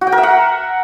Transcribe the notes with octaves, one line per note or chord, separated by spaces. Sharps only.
F#4
G5
A#4
E5
F#5